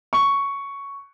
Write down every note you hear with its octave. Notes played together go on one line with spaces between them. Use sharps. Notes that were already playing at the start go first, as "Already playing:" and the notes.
C#6